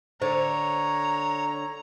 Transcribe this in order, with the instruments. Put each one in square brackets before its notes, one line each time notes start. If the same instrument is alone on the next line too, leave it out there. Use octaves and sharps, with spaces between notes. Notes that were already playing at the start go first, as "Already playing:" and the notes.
[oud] D3 [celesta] C5 [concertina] C#5 [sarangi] A#5